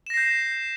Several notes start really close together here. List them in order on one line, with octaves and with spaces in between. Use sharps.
E7 A#6 C7 G6